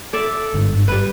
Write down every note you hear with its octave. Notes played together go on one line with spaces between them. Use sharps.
A4 D5 E5
G1 G#2 D3
G3 B4